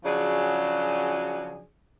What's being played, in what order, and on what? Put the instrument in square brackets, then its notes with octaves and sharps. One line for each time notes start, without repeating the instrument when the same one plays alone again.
[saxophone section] C#3 F3 F#3 D4 F#4 G#4